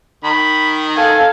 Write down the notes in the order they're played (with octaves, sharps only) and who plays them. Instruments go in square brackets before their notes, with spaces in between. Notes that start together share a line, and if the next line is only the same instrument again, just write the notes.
[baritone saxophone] D#3 [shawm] B5
[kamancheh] A4 F5 [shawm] G#5